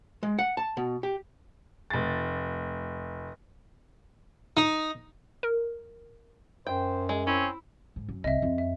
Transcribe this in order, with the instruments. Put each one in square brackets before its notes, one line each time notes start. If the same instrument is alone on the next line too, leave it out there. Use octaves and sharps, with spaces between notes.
[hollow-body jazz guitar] G#3
F#5
A5
B2
G4
[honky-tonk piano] F1 A6
[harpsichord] D#4
[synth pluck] A#4
[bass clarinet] F#2 [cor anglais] C5 [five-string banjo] G5
[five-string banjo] G#3
[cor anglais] C4 [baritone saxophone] C#4 [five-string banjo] E4
[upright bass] G#2
F#2
[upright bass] C2 [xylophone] D#5 E5
[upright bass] F2 F4
[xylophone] E5